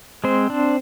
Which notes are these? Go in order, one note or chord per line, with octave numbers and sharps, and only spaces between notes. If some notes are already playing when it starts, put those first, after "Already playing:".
G#3 C4 C5
D4